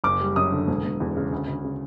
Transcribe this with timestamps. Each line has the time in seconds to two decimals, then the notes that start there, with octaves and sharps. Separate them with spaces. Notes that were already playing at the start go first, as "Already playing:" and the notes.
0.04 F#1 D6
0.21 G3
0.36 F#2 D#6
0.52 D3
0.68 E1
0.84 E1
1.00 E2
1.17 C#3
1.32 D2
1.48 D2
1.64 C#3